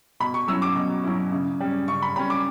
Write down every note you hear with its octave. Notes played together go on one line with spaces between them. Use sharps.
B2 B5
C#6
F#3 C#4 E4 E6
D6
B2
F#3 C#4 E4
C#3
G3 C#4
C#3 C#6
B5
G3 C#4 B5
D6